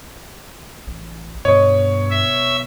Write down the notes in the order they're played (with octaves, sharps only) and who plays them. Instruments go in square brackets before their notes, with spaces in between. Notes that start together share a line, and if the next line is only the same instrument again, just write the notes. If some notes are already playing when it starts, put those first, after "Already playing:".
[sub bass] A1
[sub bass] G2 [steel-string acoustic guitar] B2 D#5 [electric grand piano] C#5
[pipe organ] E5